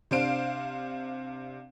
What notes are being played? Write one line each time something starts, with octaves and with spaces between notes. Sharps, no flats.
C3 D4 C5 F5 D7